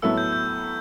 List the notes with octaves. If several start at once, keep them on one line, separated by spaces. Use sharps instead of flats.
A2 F#3 B3 E4 A4 E6
G6
G6